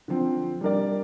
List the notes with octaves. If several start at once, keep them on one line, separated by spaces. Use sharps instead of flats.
D3 F3 C4
G3 D4 A#4 D5